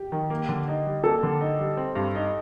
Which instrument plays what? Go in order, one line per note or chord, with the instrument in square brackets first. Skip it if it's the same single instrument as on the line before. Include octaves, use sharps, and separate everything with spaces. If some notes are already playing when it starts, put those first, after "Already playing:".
Already playing: [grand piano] G4
[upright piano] D#3
A#3
D3
D#4
G3
[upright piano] A#3 [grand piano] A4
[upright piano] D3
D#4
G3
C4
G2
D#4